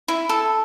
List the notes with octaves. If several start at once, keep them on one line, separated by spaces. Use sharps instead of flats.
E4
A4